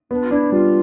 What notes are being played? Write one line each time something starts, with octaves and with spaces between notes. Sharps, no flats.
B3 D4
F4
D4 E4
G3 F4